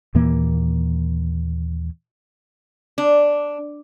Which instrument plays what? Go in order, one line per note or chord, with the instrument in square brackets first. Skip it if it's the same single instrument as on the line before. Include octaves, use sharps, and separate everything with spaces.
[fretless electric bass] D#2 A#2 E3 A#3
[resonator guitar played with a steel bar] D4